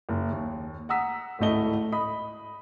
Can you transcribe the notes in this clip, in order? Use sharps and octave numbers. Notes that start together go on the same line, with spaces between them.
F#1
D#2
F#5 A#5 D#6 E6 B6
D1 G#1 A2 A3 D#5 G7
D#5 B5 D#6